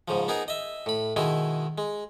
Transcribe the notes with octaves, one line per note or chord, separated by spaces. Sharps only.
G#2 C#3 F3
B3 D#4 G#4 A#4
D#5 E5
A2 B5
B2 D#3 G#3 E4
G#3